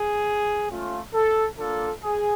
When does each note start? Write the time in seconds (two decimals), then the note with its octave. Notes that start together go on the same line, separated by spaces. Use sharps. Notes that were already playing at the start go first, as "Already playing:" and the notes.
Already playing: G#4
0.68 A3 C#4 F4
1.14 A4
1.59 A#3 D4 F4 A4
2.03 G#4